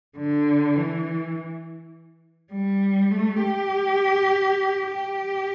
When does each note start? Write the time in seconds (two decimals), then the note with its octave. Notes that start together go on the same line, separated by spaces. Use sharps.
0.18 D3
0.76 E3
2.53 G3
3.11 A3
3.41 G4
4.89 G4